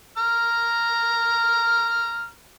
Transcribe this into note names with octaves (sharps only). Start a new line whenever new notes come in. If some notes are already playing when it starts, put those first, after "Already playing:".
A#5 F6